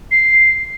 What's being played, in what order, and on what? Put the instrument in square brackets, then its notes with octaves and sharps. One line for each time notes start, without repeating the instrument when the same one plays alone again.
[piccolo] C7